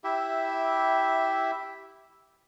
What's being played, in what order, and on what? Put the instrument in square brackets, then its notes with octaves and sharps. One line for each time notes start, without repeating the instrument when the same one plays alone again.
[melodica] E4 G4 E5